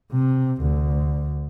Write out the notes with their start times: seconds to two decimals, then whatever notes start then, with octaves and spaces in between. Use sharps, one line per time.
0.12 C3
0.63 D2